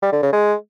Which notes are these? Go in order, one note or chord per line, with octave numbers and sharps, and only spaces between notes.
G3
D3
C#3
G#3